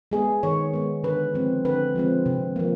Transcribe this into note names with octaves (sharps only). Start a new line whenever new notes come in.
G#3 B3 G#4
D#3 C#5
G#3 B3
D3 B4
F3 G#3 C4
D3 B4
F3 G#3 C4
C3
F3 A#3